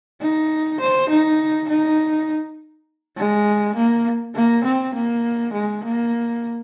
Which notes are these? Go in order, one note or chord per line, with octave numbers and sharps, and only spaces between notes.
D#4
C5
D#4
D#4
G#3
A#3
A#3
C4
A#3
G#3
A#3